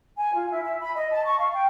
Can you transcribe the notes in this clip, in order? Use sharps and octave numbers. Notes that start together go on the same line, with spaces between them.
G#5
F4
E4
E5
B5
D#5
A5
C#6
F5
G5